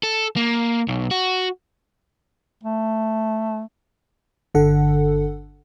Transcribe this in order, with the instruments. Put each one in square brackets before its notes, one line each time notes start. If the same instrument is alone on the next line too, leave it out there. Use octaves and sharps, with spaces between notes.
[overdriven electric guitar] A4
A#3
B1
F#4
[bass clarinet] A3
[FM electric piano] G1 D3 A4 F#5